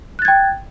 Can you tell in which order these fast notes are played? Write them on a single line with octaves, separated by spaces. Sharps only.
F#6 A6 G#6 G5